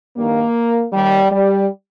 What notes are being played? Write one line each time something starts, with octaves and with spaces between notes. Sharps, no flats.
G2 D#3 A#3
D#2 D#3 G3
G3